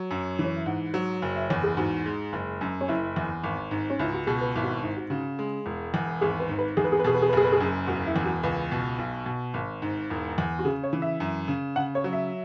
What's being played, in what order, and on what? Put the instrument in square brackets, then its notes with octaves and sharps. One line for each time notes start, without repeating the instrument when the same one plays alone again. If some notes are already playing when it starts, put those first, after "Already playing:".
Already playing: [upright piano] F#3
F#2
E3
[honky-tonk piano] C#5
E5
[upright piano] G#2 [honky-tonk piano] F#5
[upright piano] F#3
F#1
[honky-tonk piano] E5
[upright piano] E2 [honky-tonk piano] C#5
[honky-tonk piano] G#4
[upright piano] G#2 [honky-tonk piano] F#4
[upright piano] G#3
F#1
F#2
[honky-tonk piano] C#4
[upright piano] F#1 [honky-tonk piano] E4
[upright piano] E2
G#1
G#2
[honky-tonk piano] C#4
[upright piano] C#2 [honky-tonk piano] E4
[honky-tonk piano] F#4
[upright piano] B2 [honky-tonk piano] G#4
[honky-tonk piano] B4
[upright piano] G#1 [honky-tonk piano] E4
[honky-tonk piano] F#4
E4
[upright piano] G#2 [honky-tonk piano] E4
[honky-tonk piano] F#4
[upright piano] C#3 [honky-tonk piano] F#4
[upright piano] G#3
E1
E2
[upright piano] G#1 [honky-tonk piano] G#4
[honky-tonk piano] B4
[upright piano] G#2
[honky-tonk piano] B4
[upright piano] E2 [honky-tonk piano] G#4
[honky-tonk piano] B4
G#4
B4
[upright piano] B2 [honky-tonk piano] G#4
[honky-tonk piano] B4
G#4
B4
[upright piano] F#1 [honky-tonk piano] G#4
[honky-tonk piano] B4
G#4
[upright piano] F#2
[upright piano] E1 [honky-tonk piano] F#4
[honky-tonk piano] E4
[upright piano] E2
[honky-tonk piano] F#4
[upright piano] C#2 [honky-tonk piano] B4
[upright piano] B2
B1
B2
G#1
G#2
E1
E2
[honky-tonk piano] F#4
[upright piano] C#3 [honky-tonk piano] G#4
[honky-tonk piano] C#5
[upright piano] E3
[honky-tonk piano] E5
[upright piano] F#2
C#3
[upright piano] C#3 [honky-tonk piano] F#5
[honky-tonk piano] C#5
[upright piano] F#3
[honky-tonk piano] E5